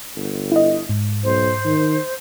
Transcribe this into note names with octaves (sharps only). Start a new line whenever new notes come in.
G1
E4 D#5
G#2
B1 C5
D#3